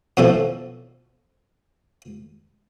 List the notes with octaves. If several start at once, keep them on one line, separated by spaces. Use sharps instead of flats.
B2 D3 E3 F3 A4